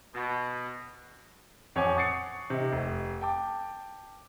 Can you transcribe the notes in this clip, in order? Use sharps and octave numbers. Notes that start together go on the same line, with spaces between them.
B2
F2 C#5 F#5 G#5 D6
F#5 C#6 D#6 A6 C7 C#7
C3 D#4
F1
G5 A5 D6